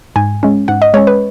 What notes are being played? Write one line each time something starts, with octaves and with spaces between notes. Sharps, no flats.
G#2 G#5
G#3 C#4
G#2 F#5
D#5
G#3 C#4 C#5
B4